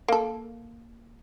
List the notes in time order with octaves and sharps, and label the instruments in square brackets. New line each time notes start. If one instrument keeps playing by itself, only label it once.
[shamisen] A#3 A4